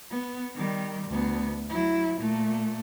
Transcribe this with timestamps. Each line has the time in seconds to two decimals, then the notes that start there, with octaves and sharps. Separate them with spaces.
0.11 B3
0.55 D#3 G3
1.08 D2 B3
1.70 F#3 E4
2.18 A#2 A3